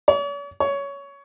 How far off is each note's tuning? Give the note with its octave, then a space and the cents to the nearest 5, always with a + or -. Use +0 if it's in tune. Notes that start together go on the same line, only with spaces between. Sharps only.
C#5 +45
C#5 +15